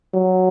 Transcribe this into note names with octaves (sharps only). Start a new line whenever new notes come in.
F#3